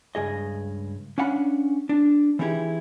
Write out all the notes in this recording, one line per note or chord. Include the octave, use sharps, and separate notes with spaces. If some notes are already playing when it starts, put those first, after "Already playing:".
C#2 G2 G#4 D#5
C#4 D4 F5 F#5 B5
D4
E3 C4 D#4 E4 G4 G#4